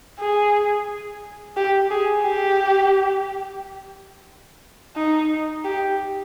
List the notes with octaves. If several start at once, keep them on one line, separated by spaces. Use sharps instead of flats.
G#4
G4
G#4
G4
D#4
G4